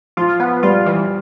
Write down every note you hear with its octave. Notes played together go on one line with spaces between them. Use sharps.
F3 F4
B3
G3 F4
E3